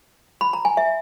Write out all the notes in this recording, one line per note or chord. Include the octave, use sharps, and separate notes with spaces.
B5
A#5
G#5
E5